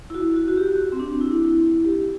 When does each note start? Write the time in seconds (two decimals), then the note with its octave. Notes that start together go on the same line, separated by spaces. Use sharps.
0.10 E4
0.14 F#4
0.36 F#4
0.48 F#4
0.57 G4
0.92 C4
1.00 D4
1.21 E4
1.85 G4